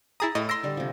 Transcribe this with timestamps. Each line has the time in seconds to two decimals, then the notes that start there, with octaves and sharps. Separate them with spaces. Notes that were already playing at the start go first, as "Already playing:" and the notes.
0.20 E4 G#4 A#5 D#6 A6
0.35 A2 D#5
0.49 C6 E6 A#6 D7
0.63 D3 G3
0.77 C3 F3